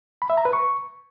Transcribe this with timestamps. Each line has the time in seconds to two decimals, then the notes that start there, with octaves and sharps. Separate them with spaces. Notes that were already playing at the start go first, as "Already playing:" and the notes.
0.22 B5
0.30 E5
0.37 A#5
0.45 B4
0.53 C#6